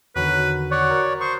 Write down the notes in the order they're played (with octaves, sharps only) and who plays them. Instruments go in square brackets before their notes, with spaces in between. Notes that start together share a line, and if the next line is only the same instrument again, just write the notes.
[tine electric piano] E2 D3 D#3 [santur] F#3 [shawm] B4
[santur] F#4 [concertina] C#5 D5 [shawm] F#5
[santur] A#4
[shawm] C5 [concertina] C#6 [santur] D#6